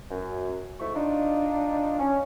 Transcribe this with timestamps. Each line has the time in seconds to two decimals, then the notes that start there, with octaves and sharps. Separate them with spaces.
0.11 F#2
0.80 G#2 A3 E4 C#6
0.95 D4 D#4 F4
1.99 C#4